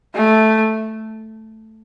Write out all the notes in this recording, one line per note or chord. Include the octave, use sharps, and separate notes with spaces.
A3